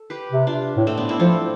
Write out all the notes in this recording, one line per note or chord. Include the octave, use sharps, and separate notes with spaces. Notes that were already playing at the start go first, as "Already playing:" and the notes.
Already playing: A4
G4 B4
C3
D4 F4
A2
A3 C4
B3 D4
C4 E4
F3 F4 A4